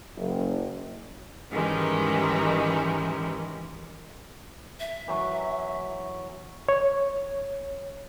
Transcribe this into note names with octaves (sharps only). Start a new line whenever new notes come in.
F#1
G#2 D#3 E3 G3 G#3 C#4
E5
E3 F#3 C#6
C#5